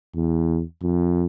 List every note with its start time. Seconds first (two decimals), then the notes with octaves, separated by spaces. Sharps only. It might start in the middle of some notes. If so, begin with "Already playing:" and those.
0.15 E2
0.82 F2